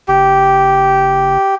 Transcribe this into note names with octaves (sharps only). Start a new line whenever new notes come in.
F#1 G4